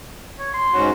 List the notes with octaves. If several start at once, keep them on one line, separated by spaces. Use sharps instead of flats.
C#5
C6
G#2 C#4 F#4